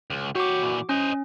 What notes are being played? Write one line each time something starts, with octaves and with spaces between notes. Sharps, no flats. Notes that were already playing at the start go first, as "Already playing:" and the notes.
C#2
F#4 G4 C#5 D6
A#2 E3
C#4 C5 D#5